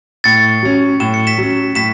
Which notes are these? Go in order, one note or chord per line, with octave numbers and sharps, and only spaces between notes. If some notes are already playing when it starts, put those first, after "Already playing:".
A2 A6 C#7
F#3 C#4
A2 E7
C#7
B6 E7
F#3 C#4
A2 B6 E7